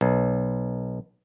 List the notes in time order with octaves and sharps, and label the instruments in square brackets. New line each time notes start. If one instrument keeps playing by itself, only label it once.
[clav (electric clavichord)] B1